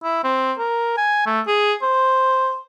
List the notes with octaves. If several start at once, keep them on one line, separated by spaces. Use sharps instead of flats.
E4
C4
A#4
G#5
A3
G#4
C5